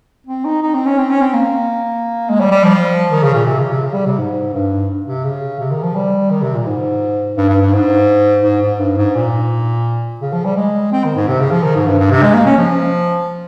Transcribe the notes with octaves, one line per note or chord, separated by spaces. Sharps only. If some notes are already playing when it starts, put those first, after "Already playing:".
C4
D#4
D#4
C4
C#4
C4
C#4
C4
A#3
G#3
G3
G3
F3
D#3
C#3
A#2
C3
C#3
C3
C#3
G3
C3
G#2
G2
C3
C#3
C3
D#3
F3
G3
D#3
C3
A#2
G#2
G2
G2
G2
G#2
G#2
G#2
G2
G#2
A#2
C#3
F3
G3
G#3
C4
D#3
G#2
C3
C#3
F3
D#3
G#2
G2
G2
C3
G#3
A#3
C#4
F3